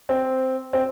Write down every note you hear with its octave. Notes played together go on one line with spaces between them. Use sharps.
C4
C4